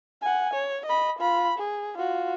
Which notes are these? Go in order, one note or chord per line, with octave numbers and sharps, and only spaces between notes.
F#5 G#5
C#5
D#5 B5
F4 B5
G#4
F4 F#4